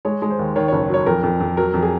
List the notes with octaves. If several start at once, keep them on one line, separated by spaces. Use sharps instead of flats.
G#3 C#5
G#3
C5
D#2
D#3 C#5
F#1 C#5
F#3 C#5
F2 A#4
F2
F2
F#3 A#4
F2
G#4